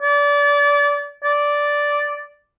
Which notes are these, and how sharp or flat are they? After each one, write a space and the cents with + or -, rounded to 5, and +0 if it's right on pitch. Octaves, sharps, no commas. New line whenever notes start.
D5 -30
D5 -5